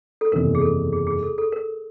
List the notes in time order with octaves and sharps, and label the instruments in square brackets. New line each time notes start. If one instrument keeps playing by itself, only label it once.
[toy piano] A4
[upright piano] F#1 E2 C3 D#3 [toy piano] A#4
[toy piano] G#4
A4
G#4
G#4
A4
A4
A#4